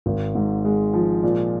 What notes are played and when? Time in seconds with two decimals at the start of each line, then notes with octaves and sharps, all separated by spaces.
0.06 G#1
0.35 G#2
0.65 G#3
0.94 F3
1.23 A#2